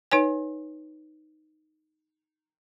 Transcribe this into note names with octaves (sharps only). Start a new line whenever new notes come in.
D#4 B4 C#5 G#5